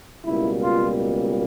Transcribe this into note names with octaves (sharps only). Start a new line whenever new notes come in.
C#2 B2 G3 A#3 E4
F4